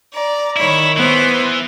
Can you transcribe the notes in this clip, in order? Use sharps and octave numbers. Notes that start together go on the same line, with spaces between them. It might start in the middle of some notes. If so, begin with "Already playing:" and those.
D5 A#5
D#3 E4 C#5 B5
E3 B3 C5